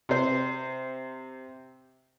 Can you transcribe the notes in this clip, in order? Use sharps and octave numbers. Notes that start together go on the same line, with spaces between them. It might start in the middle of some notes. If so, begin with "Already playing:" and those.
C3 C5